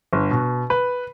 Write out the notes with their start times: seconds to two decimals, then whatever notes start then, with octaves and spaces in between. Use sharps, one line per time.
0.13 G1
0.31 B2
0.70 B4